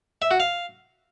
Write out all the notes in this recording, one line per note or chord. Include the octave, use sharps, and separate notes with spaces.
E5
F#4
F5